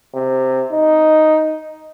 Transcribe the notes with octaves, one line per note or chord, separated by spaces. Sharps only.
C3
D#4